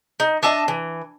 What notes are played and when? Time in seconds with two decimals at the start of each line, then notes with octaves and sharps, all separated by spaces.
0.20 D#4
0.43 D4 D#5 E5 A5
0.68 E3